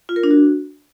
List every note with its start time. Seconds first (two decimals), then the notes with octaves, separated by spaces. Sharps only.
0.09 F4
0.16 A#4
0.23 D4
0.31 F#4